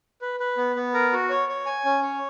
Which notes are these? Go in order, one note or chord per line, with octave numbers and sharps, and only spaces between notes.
B4
B4
B3
B3
A#4
F#4
C#5
C#5
G#5
C#4
C#5